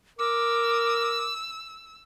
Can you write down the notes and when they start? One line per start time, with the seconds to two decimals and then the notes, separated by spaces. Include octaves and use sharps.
0.19 A#4 D6 E6